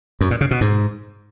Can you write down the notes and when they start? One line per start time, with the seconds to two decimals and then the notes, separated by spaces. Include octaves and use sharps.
0.21 F#2
0.31 A#2
0.41 C#3
0.51 B2
0.61 G#2